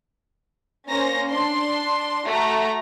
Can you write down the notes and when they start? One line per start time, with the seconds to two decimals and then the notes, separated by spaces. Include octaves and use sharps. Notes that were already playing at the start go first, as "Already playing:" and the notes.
0.88 A#3 C#4 C5 A#5 A#6
1.29 D4 C6
2.26 A3 F#4 A#5